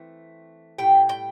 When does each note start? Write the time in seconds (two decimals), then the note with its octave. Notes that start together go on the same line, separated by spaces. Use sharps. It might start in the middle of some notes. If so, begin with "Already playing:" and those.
Already playing: E3 A3 C4
0.79 A2 G3 G5
1.09 G5